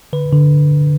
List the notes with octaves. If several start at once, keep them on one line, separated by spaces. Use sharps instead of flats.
D3 B4
D3